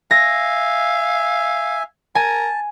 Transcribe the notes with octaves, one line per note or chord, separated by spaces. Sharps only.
E5 F5 G#5 A#6
A#4 G#5 A5